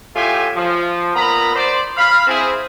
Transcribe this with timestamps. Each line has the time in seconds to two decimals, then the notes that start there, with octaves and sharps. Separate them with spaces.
0.16 A2 F4 G4 E5 G#5
0.56 F3
1.16 A#2 B3 A#5 B5
1.56 C5 D5
1.97 F5 B5
2.27 C4 E4 G#4